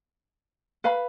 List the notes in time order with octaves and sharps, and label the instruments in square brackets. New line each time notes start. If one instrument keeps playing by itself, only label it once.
[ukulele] B4 F5 B5